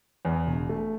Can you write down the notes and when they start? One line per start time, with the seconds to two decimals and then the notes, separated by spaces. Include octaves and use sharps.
0.25 E2
0.47 E1
0.69 A3